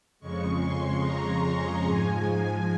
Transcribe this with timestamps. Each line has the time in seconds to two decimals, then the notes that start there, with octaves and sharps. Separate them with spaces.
0.20 F2 C#3 G#3 C#6
0.61 C6
1.02 A#5
1.84 G#2 F3 G#3 G#5